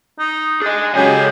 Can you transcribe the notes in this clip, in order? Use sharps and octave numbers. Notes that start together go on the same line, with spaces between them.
D#4
D4 G#4 D#5
C#3 F#3 G#3 G4 A4 G#5